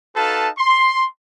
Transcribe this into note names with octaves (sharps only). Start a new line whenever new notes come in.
D#4 F#4 A4 B4 F5 A5
C6